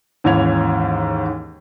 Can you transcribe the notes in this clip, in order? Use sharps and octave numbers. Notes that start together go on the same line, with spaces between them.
D#2 G#2 E3 C#4 G#6 F7